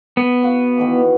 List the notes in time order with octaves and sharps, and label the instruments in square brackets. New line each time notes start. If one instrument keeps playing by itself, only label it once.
[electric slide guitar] B3
[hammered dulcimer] F#4 F5 F#5
B2 D#3 E3